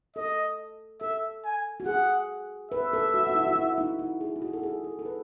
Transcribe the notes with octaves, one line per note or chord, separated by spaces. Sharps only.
A4 D#5
A4 E5
G#5
F#4
G#4 F#5
B4 E5
A4
F#4
F#4
E4
F#4
E4
D#4
E4
G#4
E4
F#4
A4
G#4
A4
A4
B4